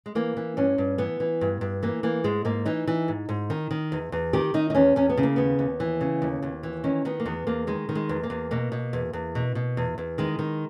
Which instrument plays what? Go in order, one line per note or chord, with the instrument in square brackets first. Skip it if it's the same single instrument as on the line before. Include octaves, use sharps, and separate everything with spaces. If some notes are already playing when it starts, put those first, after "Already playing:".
[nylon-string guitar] G#3
E3 A#3
E3
G2 C#4
G2
E3 B3
E3
G2
G2
E3 A#3
E3 A#3
G#2 G#3
G#2 A#3
E3 D#4
E3
G#2
G#2
D#3
D#3
E2
E2
D#3 G4
D#3 D#4
D#4
E2 C#4
E2 C#4
B3
C#3
A#3
D#2 B3
D#2
E3
C#3
D#2
D#2
E3
D#3 C#4
D#3 B3
A#3
E2 B3
E2 A#3
D#3 G#3
D#3
G#3
E2
A#3
E2
B2 A#3
B2
E2
E2
B2
B2
E2
E2
D#3 G#3
D#3